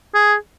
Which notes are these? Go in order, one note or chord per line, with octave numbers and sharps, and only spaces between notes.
G#4